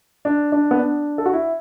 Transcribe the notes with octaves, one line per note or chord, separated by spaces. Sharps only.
D4
D4
B3
D4
A4
F#4
E4